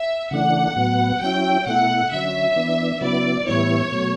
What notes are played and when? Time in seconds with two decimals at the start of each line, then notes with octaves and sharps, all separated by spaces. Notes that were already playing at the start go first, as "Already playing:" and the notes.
Already playing: E5
0.31 C#3 E3 A3 D4 F#5
0.76 A2 F#3 B3
1.21 F#3 C#4 E4 G5
1.66 B2 A3 E4 F#5
2.11 D3 F#3 C#4 E5
2.56 E3 B3 D4
3.01 C#3 F#3 B3 E4 D5
3.46 A2 E3 G3 B3 E4 C#5
3.92 B2 F#3 A3